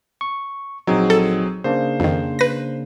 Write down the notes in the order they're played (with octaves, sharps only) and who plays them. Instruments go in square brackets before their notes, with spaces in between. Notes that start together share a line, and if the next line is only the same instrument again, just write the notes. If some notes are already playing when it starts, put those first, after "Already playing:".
[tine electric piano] C#6
[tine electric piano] A#1 D#4 [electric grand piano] F#3 C4 G#4
[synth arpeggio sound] A4
[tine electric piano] C#3 A#3 D4 [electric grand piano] C5
[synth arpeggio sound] F2 D#3
B4 A#6